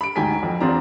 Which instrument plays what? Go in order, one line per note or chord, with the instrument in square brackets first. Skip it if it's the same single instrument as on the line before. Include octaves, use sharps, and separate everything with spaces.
[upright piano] B5 D7
D2 G#2 G5 G#5 A#5 B6
F2
E2 C4 D4 F4 A#5